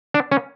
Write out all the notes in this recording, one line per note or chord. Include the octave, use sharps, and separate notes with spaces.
D4
C#4